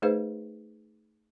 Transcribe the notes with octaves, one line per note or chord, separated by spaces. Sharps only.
A3 D#4 G#4 B4 C5 F5